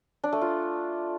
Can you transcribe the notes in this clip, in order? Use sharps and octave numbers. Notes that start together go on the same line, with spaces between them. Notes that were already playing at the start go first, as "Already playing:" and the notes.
D4
A3
F4